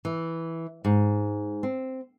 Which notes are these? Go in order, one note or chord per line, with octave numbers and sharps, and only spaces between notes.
E3
G#2
C4